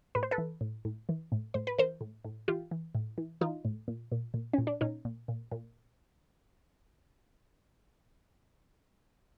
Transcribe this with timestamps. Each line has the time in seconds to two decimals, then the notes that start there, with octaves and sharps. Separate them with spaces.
0.15 A2 B4
0.23 C5
0.31 A4 B4
0.38 E3
0.61 A2
0.85 A2
1.09 E3
1.32 A2
1.54 A2 C5
1.67 B4
1.78 E3 A#4 C5
2.01 A2
2.25 A2
2.48 E3 F4 G4
2.71 E3
2.95 A2
3.18 E3
3.41 E3 D#4 F4
3.65 A2
3.88 A#2
4.12 A#2
4.34 A#2
4.53 A#2 C#4
4.67 D4
4.81 A#2 C#4 D#4
5.05 A#2
5.28 A#2
5.52 A#2